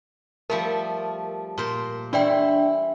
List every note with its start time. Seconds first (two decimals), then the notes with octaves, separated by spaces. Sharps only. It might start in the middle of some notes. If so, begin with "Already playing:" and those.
0.50 F3 G3 A3 A#4
1.58 A#2 C5
2.13 E3 D4 E4 D5 G5